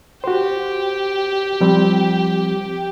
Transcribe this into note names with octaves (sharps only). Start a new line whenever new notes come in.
F#4 G4 C5
F3 G3 C4